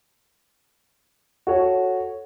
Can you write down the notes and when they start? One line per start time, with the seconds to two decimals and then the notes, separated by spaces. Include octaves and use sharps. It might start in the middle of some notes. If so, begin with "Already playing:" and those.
1.47 F#4 A4 C#5